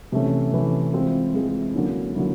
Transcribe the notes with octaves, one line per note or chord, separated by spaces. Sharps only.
C3 E3 A3 C#4
C3 E3 A3 C#4
E3 G#3 C4 F4 G#4
E3 G#3 C4 F4 G#4
D3 F#3 A#3 C#4 E4
D3 F#3 A#3 C#4 E4